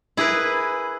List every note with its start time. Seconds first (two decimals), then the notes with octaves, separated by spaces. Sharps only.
0.17 E4 G#4 A#4 B4